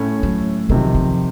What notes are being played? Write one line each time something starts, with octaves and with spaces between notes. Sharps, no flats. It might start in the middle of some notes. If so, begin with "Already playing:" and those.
Already playing: A2 A3 C#4
F#3
F2 C3 D#3 F#3
F3